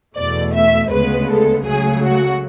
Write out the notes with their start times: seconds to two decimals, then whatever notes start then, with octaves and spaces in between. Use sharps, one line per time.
0.16 E2 B2 A3 D5
0.53 E5
0.90 D2 C#3 G#3 B3 B4
1.29 A4
1.65 C#2 C#3 F#3 A3 G#4
2.04 F#4